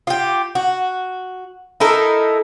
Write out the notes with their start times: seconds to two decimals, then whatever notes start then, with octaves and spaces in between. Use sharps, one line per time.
0.07 F4 G4
0.55 F#4
1.80 D#4 E4 A4 A#4